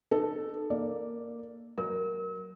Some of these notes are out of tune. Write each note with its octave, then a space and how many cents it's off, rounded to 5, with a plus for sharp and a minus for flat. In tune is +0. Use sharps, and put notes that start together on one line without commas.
D#4 -35 A4 +0
A#3 +0 D5 +0
F#3 +10 A#4 +0 E6 -45